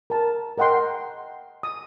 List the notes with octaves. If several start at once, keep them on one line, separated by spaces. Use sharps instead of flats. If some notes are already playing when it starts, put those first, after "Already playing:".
A#4 A5
A#4 D#5 F#5 G5 C6
D#6